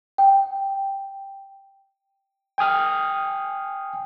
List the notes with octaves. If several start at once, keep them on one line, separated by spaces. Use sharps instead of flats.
G5
G5 G#5 D#6 F6